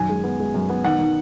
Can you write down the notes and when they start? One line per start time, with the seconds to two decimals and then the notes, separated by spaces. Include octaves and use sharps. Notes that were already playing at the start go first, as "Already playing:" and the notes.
Already playing: F#2 D#3 G#5
0.09 G#3
0.24 B3
0.39 G#3
0.54 F#2
0.69 B3
0.84 D#3 F#5
0.98 D#3